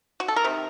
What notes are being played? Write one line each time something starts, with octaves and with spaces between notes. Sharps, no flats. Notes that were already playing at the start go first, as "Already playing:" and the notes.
F#4
A4
A#4
C3 D#3